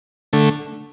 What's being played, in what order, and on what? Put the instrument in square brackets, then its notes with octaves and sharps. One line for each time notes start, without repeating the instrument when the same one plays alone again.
[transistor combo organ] D3 A3